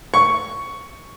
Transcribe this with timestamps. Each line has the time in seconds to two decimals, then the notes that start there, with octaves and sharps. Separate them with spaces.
0.14 C#6